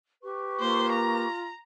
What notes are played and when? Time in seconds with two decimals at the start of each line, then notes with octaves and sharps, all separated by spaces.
0.21 G4 B4 C#6
0.60 A#3 F4 C5
0.92 A#5